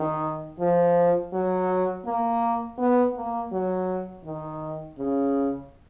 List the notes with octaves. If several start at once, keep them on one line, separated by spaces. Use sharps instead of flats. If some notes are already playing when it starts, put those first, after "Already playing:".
Already playing: D#3
F3
F#3
A#3
B3
A#3
F#3
D#3
C#3